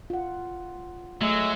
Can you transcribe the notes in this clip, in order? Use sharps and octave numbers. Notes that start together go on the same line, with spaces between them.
F4 F#5
F#3 G#3 A3 E5